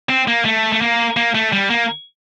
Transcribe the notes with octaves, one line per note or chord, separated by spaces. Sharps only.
C4
A#3
A3
A3
A#3
A#3
A3
G3
A#3